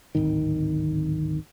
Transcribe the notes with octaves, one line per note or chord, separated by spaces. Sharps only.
D1 G#1 D#3